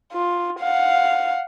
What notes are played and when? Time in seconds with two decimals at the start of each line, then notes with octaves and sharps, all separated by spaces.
0.13 F4
0.60 F5 F#5